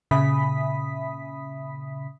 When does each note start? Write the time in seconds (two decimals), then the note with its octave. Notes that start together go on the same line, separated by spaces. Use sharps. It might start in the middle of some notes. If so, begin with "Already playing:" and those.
0.11 A#2 C#3 E5 B5 D#6 B6